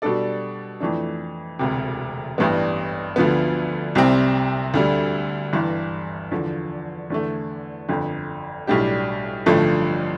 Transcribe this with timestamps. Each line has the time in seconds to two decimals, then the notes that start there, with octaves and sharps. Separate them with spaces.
0.02 B2 G3 D4 A4 D5
0.80 F2 E3 A3 D4
1.59 E1 D2 C3
2.38 A1 G2 E3 G3 B3
3.16 D2 D3 F3 B3
3.95 C2 C3 G3 C4
4.74 D2 D3 G3
5.53 G1 G2 E3
6.31 E2 D3 F3
7.10 E2 D3 A3
7.89 G1 F2 D3
8.67 B1 A2 G3 D4 G4
9.46 A1 G2 D3 F3 A3